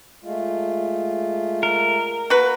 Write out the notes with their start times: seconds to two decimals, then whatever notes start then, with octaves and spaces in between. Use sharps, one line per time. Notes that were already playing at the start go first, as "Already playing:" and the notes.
0.24 G#3 A3 F4
1.63 A#4
2.30 A#3 F#4 B4 A#5